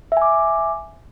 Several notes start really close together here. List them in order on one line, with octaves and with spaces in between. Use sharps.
E5 G#5 D6